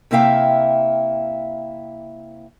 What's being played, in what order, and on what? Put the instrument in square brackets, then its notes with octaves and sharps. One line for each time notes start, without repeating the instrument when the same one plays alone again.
[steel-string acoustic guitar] C3 A#3 E4 E5 F5 G5